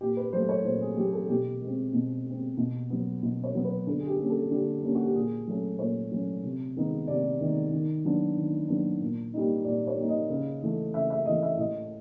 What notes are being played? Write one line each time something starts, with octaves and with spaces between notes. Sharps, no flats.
A#2 G4
B4
F#3 A3 C5
C#5
A#2 C5
G#4
F#3 A3 G4
A4
B2 G4
G#3 C4
B2
G#3 C4
B2
F#3 B3
B2
C#5
F#3 B3
B4
D3 A4
G#4
G4
G3 A#3 C#4
A4
D3 G4
G3 A#3 C#4
F#4
G4
A#2 G#4
F#3 A3 C#4
A#2 C#5
F#3 A3 C#4
C3
D#3 G#3 B3 D#4
C3 D5
D#3 G#3 B3 D#4
D#3
F#3 B3 D4
D#3
F#3 B3 D4
A#2
G3 A#3 D#4
A#2 D5
C#5
G3 A#3 D#4
D#5
C#3
E3 A3
C#3 E5
E5
E3 A3 D#5
E5
A2 D#5